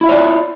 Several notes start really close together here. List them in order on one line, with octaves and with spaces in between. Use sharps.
E4 E5 F4 C#5 D5